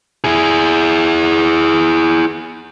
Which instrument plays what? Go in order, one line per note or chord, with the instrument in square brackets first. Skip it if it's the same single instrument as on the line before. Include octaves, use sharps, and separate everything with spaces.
[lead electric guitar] E4 G#4